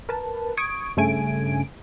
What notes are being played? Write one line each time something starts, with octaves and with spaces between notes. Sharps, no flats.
A#4 B4 A5
C#6 D#6 G#6 D7
G2 C#3 A3 G#5 D7